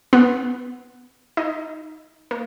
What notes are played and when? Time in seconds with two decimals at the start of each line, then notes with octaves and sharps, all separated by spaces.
0.13 B3
1.37 D#4
2.31 A#3